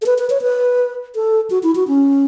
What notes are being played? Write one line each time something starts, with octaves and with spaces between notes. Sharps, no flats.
A4
B4
B4
C#5
B4
A4
F#4
E4
F#4
C#4